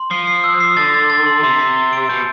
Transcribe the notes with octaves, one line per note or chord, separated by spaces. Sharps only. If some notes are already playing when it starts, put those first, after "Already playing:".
Already playing: C6
F3 C7
C7
E6
C7
D3 A6
A6
A6
C6
C3 C6
C6
G7
D7
B2 G6